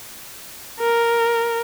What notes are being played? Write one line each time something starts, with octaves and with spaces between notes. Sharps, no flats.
A#4